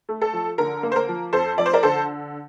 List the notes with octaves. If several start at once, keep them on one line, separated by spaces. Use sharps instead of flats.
A3
A4
F3
D3 A#4
A#3
C5
A#4
F3
F2 A4 C5
F3 D5
C5
A#4 D5
D3 A4 C5